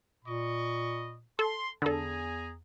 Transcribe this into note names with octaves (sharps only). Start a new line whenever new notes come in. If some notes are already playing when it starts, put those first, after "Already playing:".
A#2 D#5 B5 C#6
A4 C6
E2 D3 G#4 A4 G#5 A#5